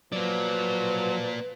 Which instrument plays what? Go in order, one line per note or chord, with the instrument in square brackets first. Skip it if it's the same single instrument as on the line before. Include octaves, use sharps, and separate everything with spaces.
[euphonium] F3 [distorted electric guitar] F#3 [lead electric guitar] A#3 D5 [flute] B4